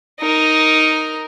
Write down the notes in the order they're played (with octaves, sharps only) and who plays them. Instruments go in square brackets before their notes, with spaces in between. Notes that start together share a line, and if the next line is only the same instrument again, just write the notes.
[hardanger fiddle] D#4 A#4